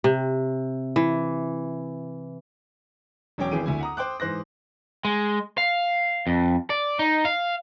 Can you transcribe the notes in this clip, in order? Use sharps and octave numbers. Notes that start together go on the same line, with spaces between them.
C3
E3
E1 F#3 C#4 C#5 G5 D6
G#1 E3 G#4 G5 D#7
D2 E4 G#5
F#5 A#5 D#6
C5 G5 D6 F#6
G#2 E3 C5 F#6 A#6
G#3
F5
F2
D5
D#4
F5